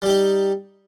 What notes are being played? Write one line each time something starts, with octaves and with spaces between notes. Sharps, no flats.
G3 D#4 G4